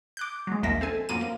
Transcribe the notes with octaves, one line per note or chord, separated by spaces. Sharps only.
D6 F#6 G6
F#3 G#3
A#1 D#2 A#3 E5 A#6 B6
C4 A4 G#5
F#2 F3 A#3 D#7
A#3